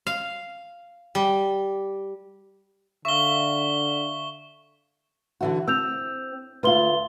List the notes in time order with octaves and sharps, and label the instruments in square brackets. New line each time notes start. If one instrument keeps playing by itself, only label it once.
[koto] F5
G3
[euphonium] D3 [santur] E5 F5 [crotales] C#6 G7
[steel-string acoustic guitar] D3 E3 F#4
[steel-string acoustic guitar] C4 [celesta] E6 G6 F7
[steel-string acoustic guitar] D2 F4 [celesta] B4 C6 G7